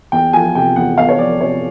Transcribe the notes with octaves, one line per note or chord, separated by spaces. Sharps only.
E2 G5
F3 G#5
C3 G5
E2 F#5
E2 F5
C#5
F3 D5
C3 C#5